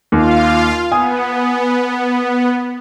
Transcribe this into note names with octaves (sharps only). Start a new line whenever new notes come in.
D#2 F4 F5
B3 G#5 D#6